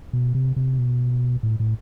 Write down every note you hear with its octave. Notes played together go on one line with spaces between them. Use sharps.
B2
C3
C3
B2
A2
A2